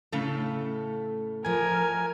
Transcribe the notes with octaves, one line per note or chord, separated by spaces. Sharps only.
A2 C#3 A3 A4
F3 E4 A#4 G#5